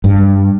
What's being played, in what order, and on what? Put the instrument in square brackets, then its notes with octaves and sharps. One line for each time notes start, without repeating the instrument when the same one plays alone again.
[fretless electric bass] G2